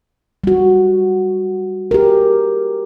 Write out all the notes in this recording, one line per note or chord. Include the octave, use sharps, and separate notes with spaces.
G3 F#4
G4 G#4 A#4